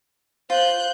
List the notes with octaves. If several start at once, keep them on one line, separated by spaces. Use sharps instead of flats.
F4 C5 F#6 G6